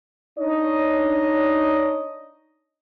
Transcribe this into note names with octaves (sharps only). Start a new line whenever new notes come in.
D4 D#4 C#5 D#5